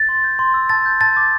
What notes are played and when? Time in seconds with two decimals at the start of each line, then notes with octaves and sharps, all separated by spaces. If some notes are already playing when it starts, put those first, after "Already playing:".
Already playing: A6
0.09 C6
0.24 G6
0.39 C6
0.54 E6
0.69 A5 A6
0.86 G6
1.01 A5 A6
1.17 D6